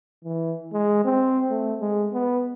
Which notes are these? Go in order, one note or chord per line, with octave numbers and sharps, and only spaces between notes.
E3
G#3
C4
A3
G#3
B3